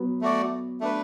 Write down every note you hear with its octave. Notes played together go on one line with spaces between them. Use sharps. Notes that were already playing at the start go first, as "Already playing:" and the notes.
Already playing: F#3 B3
A3 F#4 D5
A3 D4 B4